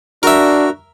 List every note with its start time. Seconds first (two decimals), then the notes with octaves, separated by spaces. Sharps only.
0.23 D4 F#4 A#4 E5